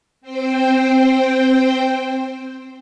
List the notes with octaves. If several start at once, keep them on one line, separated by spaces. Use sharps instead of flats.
C4 C5 G5